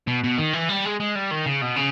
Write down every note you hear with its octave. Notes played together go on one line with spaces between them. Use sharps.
B2
B2
D#3
E3
G3
G#3
G#3
G3
D#3
C#3
B2
C#3